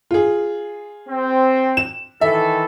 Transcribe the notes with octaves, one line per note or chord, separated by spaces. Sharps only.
F4 G#4
C4
E7
D#3 E3 A4 E5